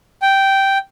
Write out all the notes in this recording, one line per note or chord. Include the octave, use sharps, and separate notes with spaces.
G5